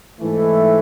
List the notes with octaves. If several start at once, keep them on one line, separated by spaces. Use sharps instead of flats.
G#2 E3 A3